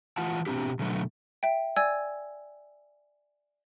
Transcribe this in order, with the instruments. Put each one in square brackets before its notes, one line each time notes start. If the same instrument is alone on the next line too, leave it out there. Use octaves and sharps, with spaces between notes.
[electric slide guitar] E3 F4 F#5 A5
B2 E3 C4 D4 G4
B2 D3 F#3 A3
[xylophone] E5 G5
D5 G#5 E6 G#6